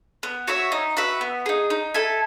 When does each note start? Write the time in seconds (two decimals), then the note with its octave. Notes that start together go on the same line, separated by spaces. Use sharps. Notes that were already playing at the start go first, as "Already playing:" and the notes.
0.23 B3
0.47 F#4 C#5 E5
0.72 D#4
0.97 F#4 B4 E5
1.21 B3
1.46 D#4 G#4
1.70 D#4
1.94 A4 E5 G#5